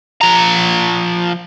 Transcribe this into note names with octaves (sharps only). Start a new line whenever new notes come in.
F3 A#5